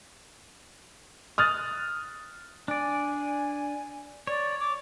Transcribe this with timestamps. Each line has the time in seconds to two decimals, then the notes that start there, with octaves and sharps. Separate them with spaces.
1.38 D#6 F6 F#6 A6
2.68 D4 D5 G#5
4.27 C#5 D5
4.59 D6